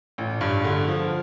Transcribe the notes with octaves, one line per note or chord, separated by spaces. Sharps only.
A1
G2
D3
F3